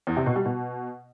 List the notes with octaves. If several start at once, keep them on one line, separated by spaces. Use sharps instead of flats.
E2
C3
B2
G3
B2